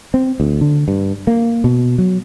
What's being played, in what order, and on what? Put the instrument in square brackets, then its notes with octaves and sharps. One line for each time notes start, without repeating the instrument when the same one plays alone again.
[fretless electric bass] C4
D2
D3
G2
A#3
B2
F#3